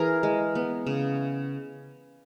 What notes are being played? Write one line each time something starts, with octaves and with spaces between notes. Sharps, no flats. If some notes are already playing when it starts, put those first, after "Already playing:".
Already playing: E3 G#4 A#4
G#3
B3
C#3